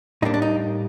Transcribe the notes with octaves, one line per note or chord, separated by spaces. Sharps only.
A2 G3 A#3 D4 D#4
D4
D#4